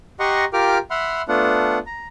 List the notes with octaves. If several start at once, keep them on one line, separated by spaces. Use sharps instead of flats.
G4 D#5 F#5 A#5 C6 C#6
F4 G4 A#4 G5 D6 F6
E5 F#5 B5 C6 F6
A3 B3 D4 F4 F#5
A#5